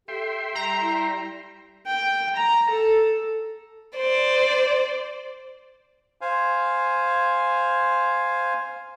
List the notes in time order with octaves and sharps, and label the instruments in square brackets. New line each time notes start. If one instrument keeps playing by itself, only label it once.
[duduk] G4 [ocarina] A4 [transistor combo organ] E5 G5 C6
[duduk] G3 [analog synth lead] A#5
[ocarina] E4
[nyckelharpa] G5
A#5
A4
[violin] C5 D5
[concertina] C5 F5 G#5